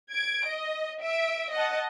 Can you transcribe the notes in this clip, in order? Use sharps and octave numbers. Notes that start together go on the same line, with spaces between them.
G#6 D7
D#5
E5 D7
D#5 F#5 A5